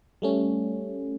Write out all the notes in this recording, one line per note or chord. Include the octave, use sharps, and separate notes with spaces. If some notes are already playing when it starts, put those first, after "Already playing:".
G3 A3 C#4